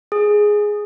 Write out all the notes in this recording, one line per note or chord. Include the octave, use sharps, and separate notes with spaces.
G#4